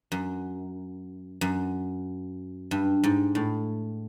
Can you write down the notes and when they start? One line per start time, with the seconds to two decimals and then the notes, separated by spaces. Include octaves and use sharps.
0.12 F#2
1.41 F#2
2.71 G2
3.04 G#2
3.35 A2